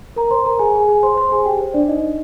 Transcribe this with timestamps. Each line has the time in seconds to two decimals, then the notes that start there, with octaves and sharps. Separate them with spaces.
0.16 A#4 A#5
0.31 C5 C6
0.46 A#4 A#5
0.59 G#4 G#5
0.74 G#4 G#5
0.88 G#4 G#5
1.03 C5 C6
1.17 C5 C6
1.32 G#4 G#5
1.45 G4 G5
1.61 C5
1.74 D4 D5
1.88 D#4 D#5